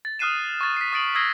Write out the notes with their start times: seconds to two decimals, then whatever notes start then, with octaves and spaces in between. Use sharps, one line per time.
0.05 A6
0.19 D#6 F6 F#6 C7 D#7 E7
0.61 C#6 A6
0.77 B6 C7
0.93 D#6 A6 D7 F#7
1.15 D#6 E6 G#6 A#6 C7 G7